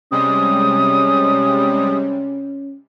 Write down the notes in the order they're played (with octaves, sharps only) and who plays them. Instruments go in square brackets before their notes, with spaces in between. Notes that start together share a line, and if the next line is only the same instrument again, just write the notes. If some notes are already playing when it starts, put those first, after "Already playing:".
[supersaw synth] C3 G3 G#3 [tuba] C#4 [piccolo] D#6